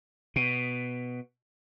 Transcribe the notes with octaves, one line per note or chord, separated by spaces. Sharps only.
B2